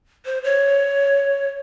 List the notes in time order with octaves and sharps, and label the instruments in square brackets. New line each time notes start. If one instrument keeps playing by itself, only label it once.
[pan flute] C5
C#5